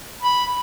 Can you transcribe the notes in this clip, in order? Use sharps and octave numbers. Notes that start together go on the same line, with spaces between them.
B5